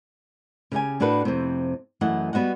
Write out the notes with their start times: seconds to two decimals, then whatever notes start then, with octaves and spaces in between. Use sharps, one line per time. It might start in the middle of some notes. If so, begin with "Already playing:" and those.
0.72 C#3 G4 D#5 G#5
1.00 A2 D4 F#4 A4 B4
1.25 F2 C3
2.01 F#2 E3 A3 D#5 F#5
2.33 G3 B3 F#4 D#5 F#5